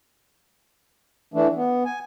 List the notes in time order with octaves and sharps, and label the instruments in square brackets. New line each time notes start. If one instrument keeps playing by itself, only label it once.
[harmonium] E3 A3 D4
B3
G#5